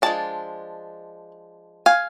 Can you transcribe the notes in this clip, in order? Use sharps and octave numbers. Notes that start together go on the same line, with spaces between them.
F3 G#3 D4 A5
F5 G#5